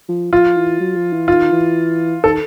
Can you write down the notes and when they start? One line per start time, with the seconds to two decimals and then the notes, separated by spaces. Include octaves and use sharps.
0.09 F3
0.32 F3 F4
0.57 E3
0.80 F#3
0.95 F3
1.13 E3
1.28 D#3 F4
1.52 E3
2.24 D#3 A4